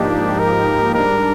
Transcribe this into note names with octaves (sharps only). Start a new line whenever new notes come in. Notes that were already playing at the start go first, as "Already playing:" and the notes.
Already playing: G#2 F3 A#3 D4 D#4 G4
A#4
G#2 G3 D4 A#4